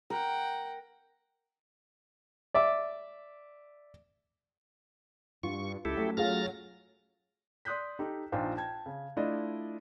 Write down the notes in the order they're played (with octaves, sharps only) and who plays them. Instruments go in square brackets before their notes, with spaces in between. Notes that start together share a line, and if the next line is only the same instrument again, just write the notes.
[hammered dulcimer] A#4 [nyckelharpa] F#5 G5
[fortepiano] D5 E5 D6
[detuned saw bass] G2 [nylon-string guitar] F4 [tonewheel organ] C#6
[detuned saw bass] C#2 [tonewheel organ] E4 G4 A4
[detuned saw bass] F#3 [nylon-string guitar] A3 C#4
[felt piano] F4 G#4 F5 [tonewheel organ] F6 A6 A#6
[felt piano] D5 C6 D#6 F#6 G6 B6
D#4 G4 A4
A#1 D4 D#4 F4 C5 G5
G5 A5 G#6
C#3
A3 D4 E4 F4 D5 D#5